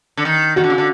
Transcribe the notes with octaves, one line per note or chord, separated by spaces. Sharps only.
D3
D#3
D#3 F#4
D3
C#3
D3